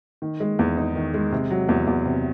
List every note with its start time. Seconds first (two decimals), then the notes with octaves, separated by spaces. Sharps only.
0.22 D#3
0.40 G#3
0.59 E2
0.77 D#4
0.96 D#3
1.14 G#3
1.32 C3
1.50 F#3
1.69 E2
1.87 E2
2.06 C3